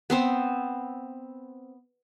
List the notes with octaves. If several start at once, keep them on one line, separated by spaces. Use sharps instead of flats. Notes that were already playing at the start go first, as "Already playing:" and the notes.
B3 C4 C5